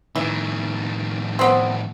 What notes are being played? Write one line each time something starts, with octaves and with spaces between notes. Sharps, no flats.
A2 D#3 E3
B3 C4